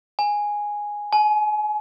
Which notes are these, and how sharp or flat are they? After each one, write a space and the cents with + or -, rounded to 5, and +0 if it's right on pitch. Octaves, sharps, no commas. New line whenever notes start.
G#5 -5
G#5 +35